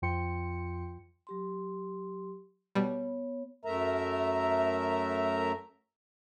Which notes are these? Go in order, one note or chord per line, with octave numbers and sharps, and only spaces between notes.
F2 F3 F4 G5 C6 C#7
F#3 G4 C6
B2 G3 B3 C#5
F#2 A3 A#4 E5 A#5